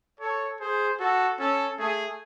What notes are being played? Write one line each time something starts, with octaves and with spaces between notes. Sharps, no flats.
A4 C#5
G#4 C5
F#4 A4
C#4 A4
A3 G#4